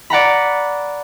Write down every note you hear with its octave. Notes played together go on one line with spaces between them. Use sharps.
D5 F#5 A#5 B5